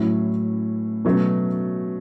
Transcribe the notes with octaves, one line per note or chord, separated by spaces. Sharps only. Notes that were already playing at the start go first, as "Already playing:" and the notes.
Already playing: A2 F#3 C#4 E4
B2 F#3 A3 C#4